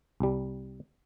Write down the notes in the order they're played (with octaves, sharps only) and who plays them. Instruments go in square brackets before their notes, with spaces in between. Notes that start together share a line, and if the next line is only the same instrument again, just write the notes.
[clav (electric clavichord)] C2 G3